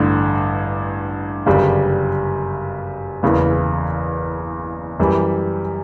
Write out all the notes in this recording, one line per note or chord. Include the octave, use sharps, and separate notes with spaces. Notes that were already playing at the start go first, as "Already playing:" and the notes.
Already playing: A1 G2 D3
G1 F#2 C#3 G3
F#1 E2 C#3 E3 B3
F#2 E3 G3